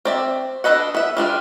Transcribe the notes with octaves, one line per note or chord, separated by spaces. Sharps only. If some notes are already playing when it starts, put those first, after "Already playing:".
C4 D5 E5
D4 A4 B4 D#5 F#5
B3 E5
G3 D4 E4 F4